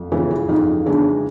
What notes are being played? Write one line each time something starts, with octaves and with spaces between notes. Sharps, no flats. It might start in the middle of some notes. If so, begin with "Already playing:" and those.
Already playing: F2
C#3 E3 G#3 F4
E4
F2 D#4
C#3 E3 G#3 D4